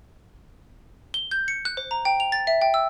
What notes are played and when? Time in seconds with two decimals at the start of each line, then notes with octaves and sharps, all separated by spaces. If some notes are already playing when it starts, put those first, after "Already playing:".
1.14 G7
1.31 G6
1.48 C#7
1.65 F#6
1.77 C5
1.91 A#5
2.05 G5
2.20 F7
2.32 A6
2.47 E5
2.62 G5
2.74 E6